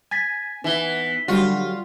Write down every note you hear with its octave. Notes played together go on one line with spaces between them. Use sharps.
G#5 G#6 A6 B6
E3 B3 D#4 G7
D3 F#3 G3 F4 F#4